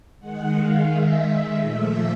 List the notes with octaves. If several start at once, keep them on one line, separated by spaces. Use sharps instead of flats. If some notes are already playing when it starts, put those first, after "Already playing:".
D#3 G#3 F#5
F5
E5
A#2 F3 A3 E5